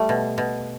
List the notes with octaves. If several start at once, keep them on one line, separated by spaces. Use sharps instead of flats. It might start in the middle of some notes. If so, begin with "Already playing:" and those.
Already playing: G3 A3
B2
B2